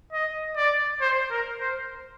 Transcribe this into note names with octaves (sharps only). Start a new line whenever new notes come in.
D#5
D5
C5
A#4
C5